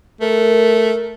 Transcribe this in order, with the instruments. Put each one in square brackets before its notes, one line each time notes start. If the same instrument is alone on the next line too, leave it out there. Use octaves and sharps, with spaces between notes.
[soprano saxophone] A3 [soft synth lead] A#4